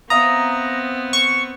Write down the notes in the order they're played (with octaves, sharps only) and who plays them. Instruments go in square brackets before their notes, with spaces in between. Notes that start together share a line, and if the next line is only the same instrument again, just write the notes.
[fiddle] B3 C4 [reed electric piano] E5 F5 D#6 [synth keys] A#5
[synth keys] C#6